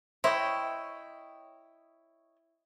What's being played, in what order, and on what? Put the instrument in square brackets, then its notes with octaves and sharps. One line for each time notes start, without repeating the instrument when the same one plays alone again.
[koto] E4 [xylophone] C5 E5 C6 [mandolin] C#5 D#5 G5